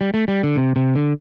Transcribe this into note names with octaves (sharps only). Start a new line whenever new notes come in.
G3
A3
G3
D3
C3
C3
D3